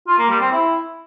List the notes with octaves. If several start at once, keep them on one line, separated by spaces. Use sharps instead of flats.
F4
A#3
G3
C4
E4